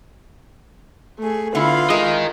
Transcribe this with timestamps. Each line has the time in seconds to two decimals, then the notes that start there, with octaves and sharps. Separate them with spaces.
1.20 A3 G#4
1.55 D3 B3 E4 F4 F5 B5
1.90 G#3 A#4 D#5